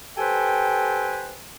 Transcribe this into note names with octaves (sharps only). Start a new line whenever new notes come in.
G4 A4 B4 C5 G5 G#5